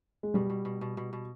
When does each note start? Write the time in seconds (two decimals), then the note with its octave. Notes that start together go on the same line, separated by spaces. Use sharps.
0.23 G#3
0.34 B2 G3
0.50 B2
0.65 B2
0.81 B2
0.97 B2
1.13 B2